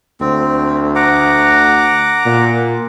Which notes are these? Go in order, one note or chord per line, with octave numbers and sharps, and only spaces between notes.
D2 C4
F#5 A#5 D6
A#2